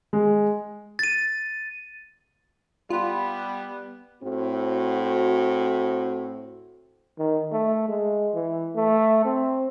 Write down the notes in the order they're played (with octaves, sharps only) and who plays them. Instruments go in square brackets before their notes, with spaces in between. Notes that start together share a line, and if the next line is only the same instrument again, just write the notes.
[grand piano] G#3
[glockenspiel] A6 D#7
[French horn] G3 [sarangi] B3 [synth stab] F4
[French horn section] A2 C4 F#4
[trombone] D#3
A3
G#3
E3
A3
C4